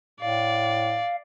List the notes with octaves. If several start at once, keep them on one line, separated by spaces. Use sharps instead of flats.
A2 D5 F5